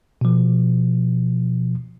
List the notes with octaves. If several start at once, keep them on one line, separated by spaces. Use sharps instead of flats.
B2 F3